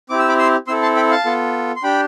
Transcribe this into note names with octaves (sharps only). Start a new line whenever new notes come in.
C4 E4 G4 D6
E6
B5 D6
C6 E6
C4 E4 A4 C6 E6
A5 C6
G5 B5
F5 A5
B3 F4 A4
C6
D4 G4 G5 B5